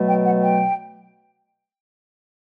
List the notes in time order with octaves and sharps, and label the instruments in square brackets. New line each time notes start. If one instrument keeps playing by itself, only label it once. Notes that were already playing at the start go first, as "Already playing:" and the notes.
Already playing: [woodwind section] B2 F#3 A3
G5
F#5
G5